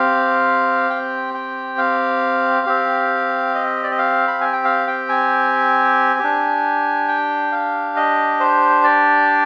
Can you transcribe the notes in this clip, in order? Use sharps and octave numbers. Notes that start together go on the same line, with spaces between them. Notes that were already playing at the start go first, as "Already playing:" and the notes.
Already playing: C4 G4 F5
G5
G5
F5
C4 G4
D#5
D5
D#5
F5
B5
G#5
G5
F5
G5
G#5
D4 G4
G5
F5
D#5
C5
D5